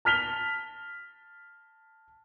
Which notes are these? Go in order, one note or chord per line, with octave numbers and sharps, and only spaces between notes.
A5 F6 B6 F7 G7